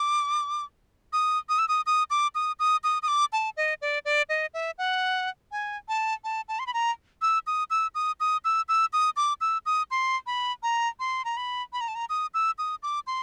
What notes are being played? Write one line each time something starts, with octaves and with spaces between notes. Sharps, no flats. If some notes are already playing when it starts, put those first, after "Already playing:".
Already playing: D6
D#6
D#6
E6
D#6
D#6
D6
D#6
D#6
D#6
D#6
D6
A5
D#5
D5
D5
D#5
E5
F#5
G#5
A5
A5
A5
C6
B5
A#5
E6
D#6
E6
D#6
D#6
E6
E6
D#6
D6
E6
D#6
C6
B5
A#5
C6
A#5
B5
B5
A#5
A5
A#5
D#6
E6
D#6
D6
C6